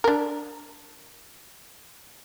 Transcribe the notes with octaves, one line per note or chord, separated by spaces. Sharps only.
D4 A#4